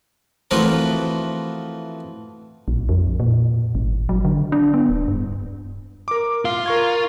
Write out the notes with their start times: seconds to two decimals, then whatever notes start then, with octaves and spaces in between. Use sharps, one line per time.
0.51 E3 F3 A3 C4 F#4 A#4
2.68 A#1
2.89 F2
3.20 A#2
3.75 G#1
4.09 F#3
4.25 D3
4.52 D4
4.74 B3
4.89 D1
5.08 G2
6.08 A#4 D6
6.45 F4 F5
6.66 A#4 C#6 G#6